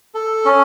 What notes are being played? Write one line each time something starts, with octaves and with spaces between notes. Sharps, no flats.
A4
C#4